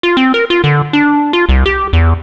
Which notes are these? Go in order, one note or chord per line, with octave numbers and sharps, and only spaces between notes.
F4
C4
A#4
F4
D3
D4
F4
C2
G4
E2